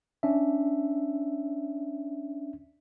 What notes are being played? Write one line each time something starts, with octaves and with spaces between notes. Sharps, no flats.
C#4 D4 E5